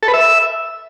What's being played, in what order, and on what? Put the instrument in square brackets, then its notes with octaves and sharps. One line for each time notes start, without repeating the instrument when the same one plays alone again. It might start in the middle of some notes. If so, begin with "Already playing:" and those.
[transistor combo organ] A4
B4
E5